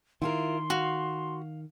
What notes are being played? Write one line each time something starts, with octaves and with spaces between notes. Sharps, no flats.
D#3 E4 F4 A#4 C6
F#4 F5